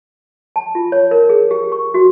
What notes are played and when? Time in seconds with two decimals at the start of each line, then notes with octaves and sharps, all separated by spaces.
0.56 A5
0.75 F4
0.92 C#5
1.11 A#4
1.29 G#4
1.51 G4
1.72 C#6
1.94 F#4